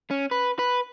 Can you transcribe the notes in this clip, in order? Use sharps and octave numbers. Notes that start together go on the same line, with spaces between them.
C#4
B4
B4